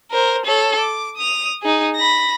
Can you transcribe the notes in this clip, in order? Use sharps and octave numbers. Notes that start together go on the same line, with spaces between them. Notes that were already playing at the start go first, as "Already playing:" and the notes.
A#4 C5
A4 C#5
D6
D#6 F7
D#4 G#4
B5 A#6